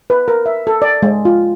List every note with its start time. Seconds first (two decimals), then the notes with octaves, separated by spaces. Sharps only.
0.10 B4
0.28 A#4
0.46 E5
0.67 A4
0.82 D5
1.03 G#3
1.25 F4